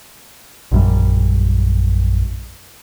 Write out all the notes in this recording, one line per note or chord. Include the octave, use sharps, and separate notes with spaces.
A#1 F#2 G3